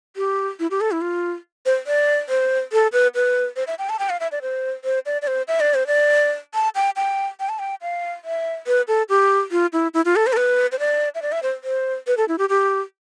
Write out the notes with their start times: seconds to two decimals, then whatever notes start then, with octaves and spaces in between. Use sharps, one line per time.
0.16 G4
0.60 E4
0.71 G4
0.81 A4
0.92 E4
1.01 F4
1.66 C5
1.87 D5
2.29 C5
2.73 A4
2.93 B4
3.15 B4
3.56 C5
3.67 E5
3.79 G5
3.89 A5
3.99 G5
4.10 F5
4.20 E5
4.32 D5
4.42 C5
4.85 C5
5.06 D5
5.22 D5
5.27 C5
5.48 E5
5.60 D5
5.74 C5
5.87 D5
6.54 A5
6.75 G5
6.96 G5
7.40 G5
7.49 A5
7.59 G5
7.82 F5
8.25 E5
8.67 B4
8.88 A4
9.09 G4
9.51 F4
9.73 E4
9.94 E4
10.05 F4
10.16 A4
10.27 C5
10.33 A4
10.37 B4
10.72 C5
10.79 D5
11.15 E5
11.22 D5
11.32 E5
11.43 C5
11.64 C5
12.07 B4
12.17 A4
12.28 E4
12.38 G4
12.49 G4